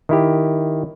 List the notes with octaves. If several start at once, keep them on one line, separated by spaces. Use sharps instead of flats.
D#3 E4 G4